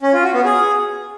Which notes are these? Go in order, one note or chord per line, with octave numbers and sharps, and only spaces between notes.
C#4
F4
F#4
B3
G#4